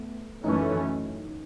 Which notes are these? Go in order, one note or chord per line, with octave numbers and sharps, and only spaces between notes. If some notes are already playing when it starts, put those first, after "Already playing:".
Already playing: A3 B3
F#2 E3 A3 C#4 D#4